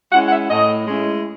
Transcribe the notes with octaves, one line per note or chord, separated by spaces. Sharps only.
G#3 C#4 E4 F#5
F#5
E5
A2 D#5
G#3 C#4 E4